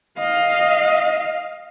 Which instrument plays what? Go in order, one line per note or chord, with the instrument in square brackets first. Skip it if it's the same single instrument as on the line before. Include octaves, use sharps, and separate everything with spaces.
[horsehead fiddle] D#5 F5